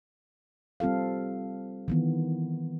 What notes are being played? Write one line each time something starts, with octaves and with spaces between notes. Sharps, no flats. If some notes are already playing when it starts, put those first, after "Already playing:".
G3 C4 F4 A4 F5
D#3 E3 B3